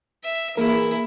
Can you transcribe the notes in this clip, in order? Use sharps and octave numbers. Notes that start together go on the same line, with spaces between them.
E5
E3 A#3 E4 G#4 A#4